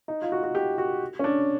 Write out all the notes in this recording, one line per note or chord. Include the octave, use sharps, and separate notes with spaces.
D#4
F4
F#4
F#4
G4
F#4
C#4
D4